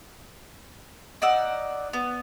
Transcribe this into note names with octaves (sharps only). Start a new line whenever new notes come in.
D#4 D5 F#5 E6
B3